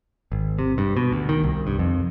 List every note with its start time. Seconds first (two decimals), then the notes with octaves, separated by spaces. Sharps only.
0.32 G#1
0.59 C3
0.78 G2
0.97 B2
1.12 D2
1.29 D#3
1.43 C2
1.67 G2
1.79 F2